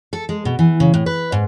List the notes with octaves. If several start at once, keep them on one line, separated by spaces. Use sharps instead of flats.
A4
G#3
B2
E3
C#3
A2
B4
G#2